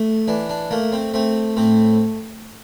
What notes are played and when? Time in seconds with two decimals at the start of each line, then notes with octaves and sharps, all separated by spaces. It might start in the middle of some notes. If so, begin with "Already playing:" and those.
Already playing: A3
0.28 E3 D4
0.49 D4
0.71 A3 A#3
0.92 C4
1.14 A3 C4
1.57 A2 C4